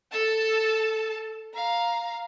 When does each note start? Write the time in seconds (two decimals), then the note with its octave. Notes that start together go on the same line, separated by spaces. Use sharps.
0.12 A4 A5
1.54 F5 A#5